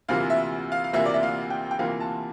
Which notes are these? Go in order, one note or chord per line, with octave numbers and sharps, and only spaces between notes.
D2 C3 E3 A#3 F4 F5
E5
F5
F5
D2 C3 E3 A#3 F4 E5
D5
E5
F5
G5
G5
D2 C3 E3 A#3 F4 F5
A5